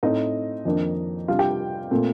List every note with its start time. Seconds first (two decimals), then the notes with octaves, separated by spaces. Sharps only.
0.03 A2 A3 C4 D#4 D#5
0.65 F2 D#3 A#3 D4
1.28 C3 G3 D4 F4 F5
1.39 G4 G5
1.91 A#2 A3 C4